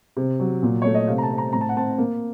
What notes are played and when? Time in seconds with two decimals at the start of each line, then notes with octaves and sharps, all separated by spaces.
0.17 C3
0.40 F#3
0.63 A#2
0.82 A3 C#5
0.95 D#5
1.07 C3 F5
1.18 A#5
1.23 A5
1.31 C4
1.38 A#5
1.53 A2 A#5
1.61 A5
1.69 F#5
1.76 C4 A5
1.98 A#3